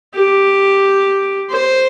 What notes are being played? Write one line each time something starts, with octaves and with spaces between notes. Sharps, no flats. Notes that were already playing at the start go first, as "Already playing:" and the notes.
G4
C5